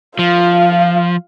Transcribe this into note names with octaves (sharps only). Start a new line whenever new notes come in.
F3 F4 F5